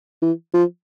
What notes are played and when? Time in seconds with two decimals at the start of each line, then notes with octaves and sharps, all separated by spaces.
0.22 E3
0.54 F3